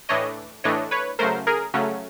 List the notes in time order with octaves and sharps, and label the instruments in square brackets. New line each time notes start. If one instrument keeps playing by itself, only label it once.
[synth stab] A2 E3 A3 D4 C#5 D#5
A2 E3 A3 D4 C#5 D#5
B4 C#5
C#3 F#3 A3 C#4 A#4 C5
G#4 A#4
C#3 F#3 A3 C#4